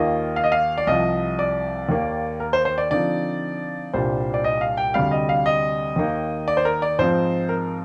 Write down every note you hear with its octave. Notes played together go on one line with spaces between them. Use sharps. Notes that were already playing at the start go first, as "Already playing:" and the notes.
Already playing: D#2 D#3 A#3 F4 D#5
F5
D#5
F5
D5
C2 C3 F3 D#5
D5
D#2 D#3 A#3
A#4
C5
C5
D5
D3 F3 C4 D#4 D5
C2 A#2 G3 D4 C5
D5
D#5
F5
G5
D2 C3 G3 F5
D#5
F5
D#5
D#2 D#3 A#3 D#4
D5
C5
A#4
D5
G#2 F3 C4 D#4 C5
A#4